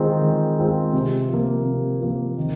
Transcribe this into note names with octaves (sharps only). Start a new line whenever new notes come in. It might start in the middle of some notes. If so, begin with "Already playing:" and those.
Already playing: D#3 G#3 C4 F4
D#3
G#3 C4 F4
C3
F3 A#3
C3
F3 A#3
D#3